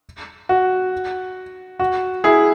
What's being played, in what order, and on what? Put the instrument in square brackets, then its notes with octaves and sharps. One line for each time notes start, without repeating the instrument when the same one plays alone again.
[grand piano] F#4
F#4
E4 G#4